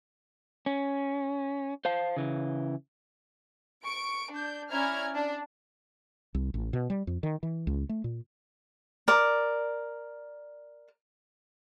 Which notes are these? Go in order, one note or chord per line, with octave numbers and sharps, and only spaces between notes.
C#4
C5 F5 A5
C#3 E3
C#6 D7
D4 G6
C#4 E4 D5 A#5 F6 G#6
D4
C2
A1
B2
G3
F2
D#3
E3
C#2
A3
A#2
A#4 D5